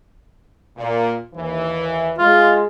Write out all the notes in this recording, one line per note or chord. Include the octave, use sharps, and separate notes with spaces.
A#2
D#2 E3
G#3 F4